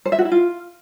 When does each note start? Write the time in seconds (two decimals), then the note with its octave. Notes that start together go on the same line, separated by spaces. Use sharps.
0.05 C5
0.12 E5
0.19 F#4
0.25 E4
0.32 F4